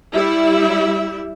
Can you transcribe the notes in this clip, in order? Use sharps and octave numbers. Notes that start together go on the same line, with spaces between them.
G3 E4 E5